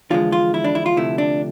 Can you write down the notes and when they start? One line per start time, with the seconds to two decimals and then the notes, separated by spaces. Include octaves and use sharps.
0.10 E2 D3 F3 G#3 F4
0.32 F4
0.54 E4
0.64 D4
0.75 E4
0.86 F4
0.96 D2 C3 F3 A3 E4
1.18 D4